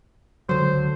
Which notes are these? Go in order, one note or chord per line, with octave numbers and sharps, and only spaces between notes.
C#2 D3 F#3 C5